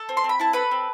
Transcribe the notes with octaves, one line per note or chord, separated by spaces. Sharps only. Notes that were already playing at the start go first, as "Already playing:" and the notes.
Already playing: A4
C4
C6
C4
B5
E4 A5
A4 B4 B5
C4